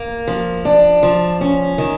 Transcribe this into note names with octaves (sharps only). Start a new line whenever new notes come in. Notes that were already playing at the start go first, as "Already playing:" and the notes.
Already playing: A#3
F3
D4
F3
C#4
D#3